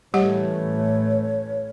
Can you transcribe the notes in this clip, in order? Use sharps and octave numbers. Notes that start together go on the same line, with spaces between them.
A1 E3 G3 A3 G4 C#5 F#5